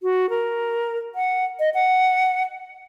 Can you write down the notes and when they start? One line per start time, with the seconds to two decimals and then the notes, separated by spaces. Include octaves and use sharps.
0.03 F#4
0.30 A#4
1.15 F#5
1.59 D#5
1.74 F#5